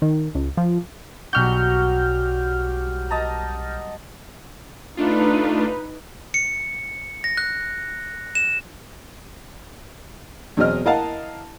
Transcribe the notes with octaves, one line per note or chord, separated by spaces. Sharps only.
D#3
C#2
F3
B1 F#3 G3 F#4 F6 G6
D#5 A5 A#5
A3 D4 D#4 F4 B4
C#7
A#6
F#6
E7
E2 B2 F#3 C4 D#5 F6
E4 A#4 D#5 F5 F#5 A5